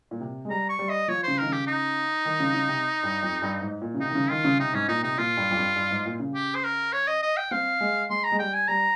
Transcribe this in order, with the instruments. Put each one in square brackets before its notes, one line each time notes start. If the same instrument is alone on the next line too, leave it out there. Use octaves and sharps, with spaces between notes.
[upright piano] A#2
C3
G#3
[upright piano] G3 [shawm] A#5
[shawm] C#6
[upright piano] G3
[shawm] D#5
[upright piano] F3 [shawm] C#5
[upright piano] C#3 [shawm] C5
[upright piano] D#3 [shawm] A#4
[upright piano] C#3
[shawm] G4
D#4
[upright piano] D#3
C#3
C#3
C3
G2
F2
G2
G#2
A#2
C#3
[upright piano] C3 [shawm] D#4
[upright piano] D#3
C#3
[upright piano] D#3 [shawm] F4
[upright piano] C#3
[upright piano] C3 [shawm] D#4
[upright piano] G#2 [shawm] C#4
[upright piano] A#2 [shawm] D#4
[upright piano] C3 [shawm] D#4
[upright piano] A#2 [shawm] F4
[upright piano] G2
F2
G2
G2
G#2
A#2
C#3
[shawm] G4
C5
A#4
C#5
D#5
D#5
G5
[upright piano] C4 [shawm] F5
[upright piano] G#3
[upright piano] G#3 [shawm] C6
[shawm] A#5
[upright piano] G#3
[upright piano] G3 [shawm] G5
[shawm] G#5
[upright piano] G3 [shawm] A#5